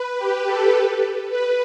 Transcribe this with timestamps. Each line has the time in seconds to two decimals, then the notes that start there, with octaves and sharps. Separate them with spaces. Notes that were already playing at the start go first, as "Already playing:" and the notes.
Already playing: B4
0.18 G4
0.46 A4
1.30 B4